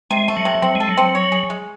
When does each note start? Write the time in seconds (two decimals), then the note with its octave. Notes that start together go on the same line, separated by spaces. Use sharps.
0.11 C3 G#3
0.28 A3
0.37 F#3
0.45 C3
0.62 F#3 C4
0.75 G#3 A4
0.89 F#3
0.97 C4
1.15 C#5
1.32 G#4
1.50 G#3